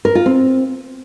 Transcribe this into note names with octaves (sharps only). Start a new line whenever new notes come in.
A#4
F4
C4